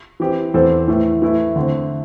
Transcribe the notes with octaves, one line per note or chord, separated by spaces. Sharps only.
E3 C4 G4
E2 E3 C4 A4 C5
A2 E3 A3
E3 A3 E4
D3 A3 C4